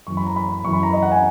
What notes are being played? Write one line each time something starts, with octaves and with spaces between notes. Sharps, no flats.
F#2 E3 C#6
B5
A#5
B5
F#2 E3 C#6
B5
A#5
D#5
F#5
G#5